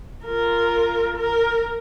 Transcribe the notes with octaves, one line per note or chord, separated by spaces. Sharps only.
F4 A#4
A#4